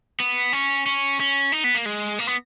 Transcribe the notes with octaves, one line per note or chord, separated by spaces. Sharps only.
B3
C#4
C#4
C#4
D#4
B3
A#3
G#3
A#3
B3